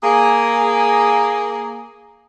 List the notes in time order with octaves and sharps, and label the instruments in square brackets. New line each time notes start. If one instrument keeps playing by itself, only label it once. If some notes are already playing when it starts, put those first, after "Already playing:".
[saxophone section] A#3 G#4